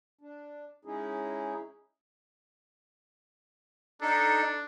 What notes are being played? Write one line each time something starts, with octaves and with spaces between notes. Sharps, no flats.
D4
G#3 C#4 D#4 E4 G#4
D4 D#4 A4